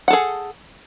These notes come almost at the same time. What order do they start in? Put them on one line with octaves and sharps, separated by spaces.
F#5 A4 G#4